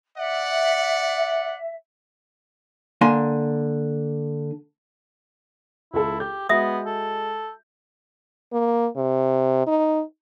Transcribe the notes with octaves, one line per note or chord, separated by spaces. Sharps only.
D5 E5 F#5
D3 A#3 G#5 C6
C#2 E4 A4
G4 G6
G#3 B3 F#4 E5 D#6
A4
A#3
C3
D#4